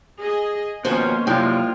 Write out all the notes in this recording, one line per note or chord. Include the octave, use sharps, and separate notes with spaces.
G#4 D#5
B2 D#3 F3 A#3 C#4 C5
F#2 C3 G3 A#3 E4 F4 G5